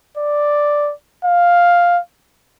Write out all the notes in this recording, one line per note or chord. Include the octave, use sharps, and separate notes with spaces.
D5
F5